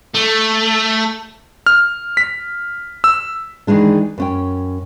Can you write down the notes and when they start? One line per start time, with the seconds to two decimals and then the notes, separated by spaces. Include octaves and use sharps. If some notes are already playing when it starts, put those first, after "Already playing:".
0.15 A3
1.66 F6
2.17 B6
3.04 E6
3.67 D#3 E3 G#3 D4
4.18 F#2 C#4 G5